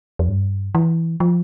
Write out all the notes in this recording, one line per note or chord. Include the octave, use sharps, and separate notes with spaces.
F2
G2
E3
F3